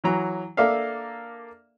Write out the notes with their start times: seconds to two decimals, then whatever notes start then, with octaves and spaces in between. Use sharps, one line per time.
0.04 E3 F#3 A#5
0.57 A#3 D4 A4 D5 E5 F5